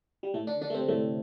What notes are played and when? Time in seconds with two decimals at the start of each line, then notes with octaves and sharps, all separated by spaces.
0.23 G3
0.34 A2 A3
0.47 D3 D4
0.61 D3 D4
0.70 A3
0.74 C3 C4
0.88 A2 A3